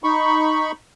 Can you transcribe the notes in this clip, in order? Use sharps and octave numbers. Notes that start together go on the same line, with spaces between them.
D#4 B5 C#6